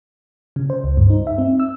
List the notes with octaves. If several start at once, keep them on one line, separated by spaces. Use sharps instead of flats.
C#3
C5
C#2
G2
D#4
E5
C4
E6